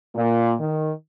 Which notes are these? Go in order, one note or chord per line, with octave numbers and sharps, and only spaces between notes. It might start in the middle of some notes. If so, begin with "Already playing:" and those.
A#2
D#3